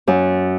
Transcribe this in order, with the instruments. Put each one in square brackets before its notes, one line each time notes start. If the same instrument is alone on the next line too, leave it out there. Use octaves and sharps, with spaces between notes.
[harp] F#2